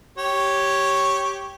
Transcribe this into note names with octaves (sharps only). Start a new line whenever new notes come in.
G4 C#5